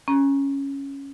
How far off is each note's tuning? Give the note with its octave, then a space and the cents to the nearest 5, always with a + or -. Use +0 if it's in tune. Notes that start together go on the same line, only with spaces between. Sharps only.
C#4 +0 A#5 +20